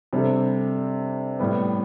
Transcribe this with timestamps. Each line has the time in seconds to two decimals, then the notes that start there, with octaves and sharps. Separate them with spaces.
0.13 C3 G3 D4 A4
1.39 A2 G3 B3